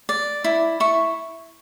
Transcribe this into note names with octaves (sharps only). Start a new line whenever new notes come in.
D5
E4
E4 C#6